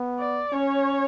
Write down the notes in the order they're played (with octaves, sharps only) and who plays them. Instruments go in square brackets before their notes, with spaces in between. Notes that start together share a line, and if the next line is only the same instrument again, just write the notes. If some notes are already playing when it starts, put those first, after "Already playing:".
Already playing: [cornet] B3
[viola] D5
[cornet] C#4 [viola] C#5